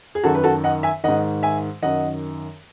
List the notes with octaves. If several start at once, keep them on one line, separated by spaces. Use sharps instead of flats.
G#4
F#2 D#3 F#4 A4
B4
F#4 A4
D#5 F#5
E5 G#5
G#2 D#3 D#5 F#5
E5 G#5
F#2 D#3 D#5 F#5